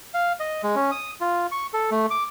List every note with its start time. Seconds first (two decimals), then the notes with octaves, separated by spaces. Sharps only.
0.14 F5
0.40 D#5
0.63 G#3
0.75 C#4
0.91 D#6
1.21 F4
1.52 C#6
1.73 A4
1.91 A3
2.10 D6